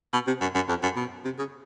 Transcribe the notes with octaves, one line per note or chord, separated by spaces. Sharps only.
B2
C3
F#2
F#2
F2
F#2
B2
C3
C#3